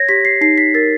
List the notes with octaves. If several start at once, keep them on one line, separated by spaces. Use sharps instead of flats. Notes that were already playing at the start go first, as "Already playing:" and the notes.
Already playing: C#5 G#6 A#6
G4 B6
C7
D#4 C7
B6
A#4 A6